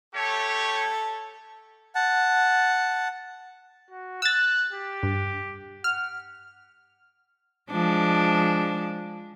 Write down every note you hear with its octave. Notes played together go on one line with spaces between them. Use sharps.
A3 G4 A4 C#5
F#5 A5
F#4
E6 F#6 A6
G4
G2
F#5 F6
F3 G#3 D4